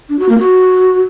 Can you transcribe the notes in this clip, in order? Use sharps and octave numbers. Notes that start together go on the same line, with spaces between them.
D4
F#4
A#3
F#4